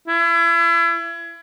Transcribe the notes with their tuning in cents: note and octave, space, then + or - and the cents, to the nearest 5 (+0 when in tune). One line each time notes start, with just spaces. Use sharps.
E4 +35